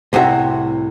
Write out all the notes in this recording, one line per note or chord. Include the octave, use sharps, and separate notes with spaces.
C2 A2 C3 F#4 E5